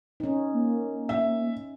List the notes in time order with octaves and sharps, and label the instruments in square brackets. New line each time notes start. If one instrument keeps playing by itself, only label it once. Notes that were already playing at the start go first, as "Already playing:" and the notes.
[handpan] C#4 D#4
[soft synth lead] A#3
[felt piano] E5